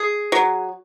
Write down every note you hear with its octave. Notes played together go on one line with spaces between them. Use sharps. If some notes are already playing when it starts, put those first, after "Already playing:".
Already playing: G#4
F#3